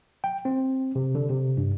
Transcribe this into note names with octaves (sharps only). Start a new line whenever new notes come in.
G5
C4
C3
D3
C3
G2